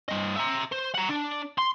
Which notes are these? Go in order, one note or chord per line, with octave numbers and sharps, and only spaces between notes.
G2 D#5
E5 A#5
C5
F#5 A#5
D4
C6